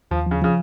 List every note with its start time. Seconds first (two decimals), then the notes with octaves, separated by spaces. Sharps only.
0.11 D#2 F3
0.26 C#3 F3
0.42 C#3 F3